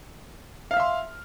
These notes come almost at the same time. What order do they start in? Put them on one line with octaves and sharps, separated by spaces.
F5 F6 E5 C6